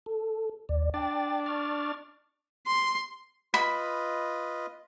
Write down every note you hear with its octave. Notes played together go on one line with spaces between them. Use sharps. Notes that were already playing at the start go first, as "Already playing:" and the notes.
A4
D#2 D5
D4 G5 A6
C#6 F6 A6
C6
F4 B4 D#5 B5